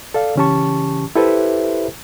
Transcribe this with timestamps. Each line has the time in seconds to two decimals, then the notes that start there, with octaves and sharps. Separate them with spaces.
0.14 A4 D5 F5
0.36 C#3 E3 C#4 G4 A5 C#6
1.16 E4 G4 A4 B4 C5 E5